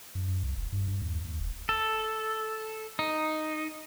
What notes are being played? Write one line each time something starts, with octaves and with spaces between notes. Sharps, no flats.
F#2
F#2
C2
E1
G2
G2
D#2
D#2
E1
A4
D#4